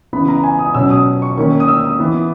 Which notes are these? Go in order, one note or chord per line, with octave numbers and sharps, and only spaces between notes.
C#3 E3 B3 B5
A#5
G#5
D#6
B2 F#3 C#4 E6
D#6
C#6
D#3 A#3 C#4 C#6
D#6
E6
D#6
E3 B3